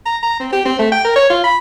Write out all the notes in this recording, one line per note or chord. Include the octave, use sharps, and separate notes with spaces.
A#5
A#5
C4
G4
C4
A3
G5
A#4
C#5
F4
B5